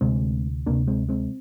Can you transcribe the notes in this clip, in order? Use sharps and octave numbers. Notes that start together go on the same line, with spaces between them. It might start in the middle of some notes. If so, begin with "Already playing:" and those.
D2 C3 G#3 C4
D2 C3 A#3 D4
G#3 C4
G#3 C4